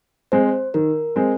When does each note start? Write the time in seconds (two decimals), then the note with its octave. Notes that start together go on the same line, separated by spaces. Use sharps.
0.32 G#3 C4 C5
0.74 D#3 A#4
1.16 G#3 C4